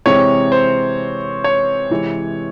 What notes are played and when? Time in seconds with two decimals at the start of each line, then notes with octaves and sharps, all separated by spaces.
0.06 C3 E3 G#3 C4 C#5
0.52 C5
1.44 C#5
1.91 C3 E3 G#3